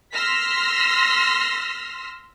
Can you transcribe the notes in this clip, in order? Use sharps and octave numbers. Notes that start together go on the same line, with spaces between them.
C6 E6 F6 A#6 B6